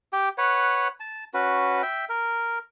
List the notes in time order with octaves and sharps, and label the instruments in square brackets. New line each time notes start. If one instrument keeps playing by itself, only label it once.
[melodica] G4 G5
B4 C#5 F#5
A5
C#4 F#4 B4
E5 G5
A#4